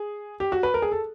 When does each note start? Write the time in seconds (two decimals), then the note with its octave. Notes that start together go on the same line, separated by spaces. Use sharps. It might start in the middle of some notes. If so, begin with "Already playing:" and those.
Already playing: G#4
0.40 G4
0.52 F#4
0.63 B4
0.74 A#4
0.82 G#4
0.92 A4